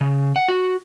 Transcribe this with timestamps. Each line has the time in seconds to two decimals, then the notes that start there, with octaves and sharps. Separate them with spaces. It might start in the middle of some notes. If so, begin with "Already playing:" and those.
0.01 C#3
0.36 F#5
0.48 F#4